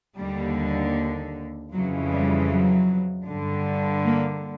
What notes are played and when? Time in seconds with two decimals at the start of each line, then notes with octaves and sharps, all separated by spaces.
0.18 D#2 D3 G3
1.73 F2 C#3 E3 F#3
2.12 G3
2.51 F#3
3.28 G2 D3
4.05 A#3